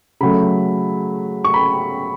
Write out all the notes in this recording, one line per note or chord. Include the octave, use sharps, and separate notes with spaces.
C#3 F#3 A3 B5
C#6
B5